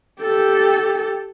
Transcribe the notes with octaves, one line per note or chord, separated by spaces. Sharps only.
G4 A4